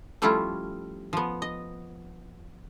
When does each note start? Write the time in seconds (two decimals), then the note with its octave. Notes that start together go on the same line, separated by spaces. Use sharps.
0.22 F3 G3 A3 C#4 E4 F4
1.13 F3 B3
1.42 D#5